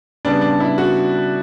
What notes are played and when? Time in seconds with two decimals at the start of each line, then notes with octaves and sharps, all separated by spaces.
0.25 C#3 G3 B3 D4
0.41 D4
0.60 E4
0.78 F#4